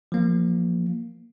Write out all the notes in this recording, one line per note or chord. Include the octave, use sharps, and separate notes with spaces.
F3 A#3